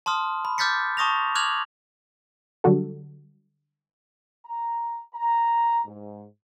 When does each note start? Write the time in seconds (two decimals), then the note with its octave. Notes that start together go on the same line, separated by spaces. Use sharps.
0.06 A5 C6 D#6 F6
0.45 B5
0.58 D6 F6 G6 A6 B6 C#7
0.97 A5 C#6 D#6 A#6 F7
1.35 D6 F6 F#6 G#6 F7 F#7
2.64 D3 F#3 G3 F#4 A4
4.45 A#5
5.14 A#5
5.85 G#2